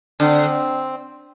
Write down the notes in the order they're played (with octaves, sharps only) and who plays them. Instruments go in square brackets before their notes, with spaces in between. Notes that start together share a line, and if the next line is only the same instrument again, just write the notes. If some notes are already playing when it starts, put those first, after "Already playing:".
[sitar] D3 [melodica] C4